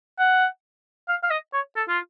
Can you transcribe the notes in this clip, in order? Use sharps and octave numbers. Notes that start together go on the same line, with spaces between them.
F#5
F5
F5
D#5
C#5
A4
F4